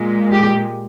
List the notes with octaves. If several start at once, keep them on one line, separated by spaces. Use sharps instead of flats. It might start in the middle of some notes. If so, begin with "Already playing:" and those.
Already playing: A#2 G#3
G4